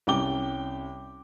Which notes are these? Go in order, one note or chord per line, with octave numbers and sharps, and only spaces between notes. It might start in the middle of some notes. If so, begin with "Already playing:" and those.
C2 C#4 G5 D6 G7